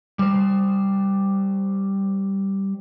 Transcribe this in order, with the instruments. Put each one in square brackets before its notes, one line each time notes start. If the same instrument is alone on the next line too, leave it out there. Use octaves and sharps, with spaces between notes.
[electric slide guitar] G3 C5